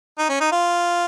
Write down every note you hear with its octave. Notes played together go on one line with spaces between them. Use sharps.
D#4
C#4
D#4
F4